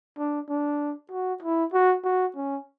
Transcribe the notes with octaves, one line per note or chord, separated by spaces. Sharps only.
D4
D4
F#4
E4
F#4
F#4
C#4